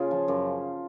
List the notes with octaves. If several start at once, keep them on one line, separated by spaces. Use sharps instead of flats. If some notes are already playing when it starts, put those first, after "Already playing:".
Already playing: C#3 F4
F3
F#2